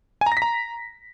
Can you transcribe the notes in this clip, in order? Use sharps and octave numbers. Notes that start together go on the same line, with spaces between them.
G#5
A#5
A#6
B6
A#5